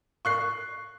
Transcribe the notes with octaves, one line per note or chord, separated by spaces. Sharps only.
C#6 F#6 C7